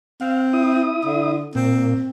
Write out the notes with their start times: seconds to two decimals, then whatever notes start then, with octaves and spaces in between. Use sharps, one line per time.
0.21 C4 F5
0.53 E4 D#6
1.05 D3
1.55 A#2 C4